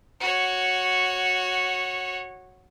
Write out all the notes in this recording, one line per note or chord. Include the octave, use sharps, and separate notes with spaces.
F#4 C#5